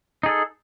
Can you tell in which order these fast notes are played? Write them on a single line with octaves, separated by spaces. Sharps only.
D#4 G#4 A4